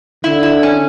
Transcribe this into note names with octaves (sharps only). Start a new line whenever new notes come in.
D3 E4
E4
C#4